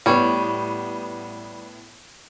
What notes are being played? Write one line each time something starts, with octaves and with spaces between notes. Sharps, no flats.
A2 G3 B3 C#5